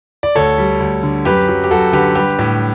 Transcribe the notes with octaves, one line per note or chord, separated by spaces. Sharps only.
D5
D2 A4 C#5
G3
D2
D3
F#2 G4 B4
F#3
G4
F#2 F#4 A4
D3 G4 B4
G3 G4 B4
A2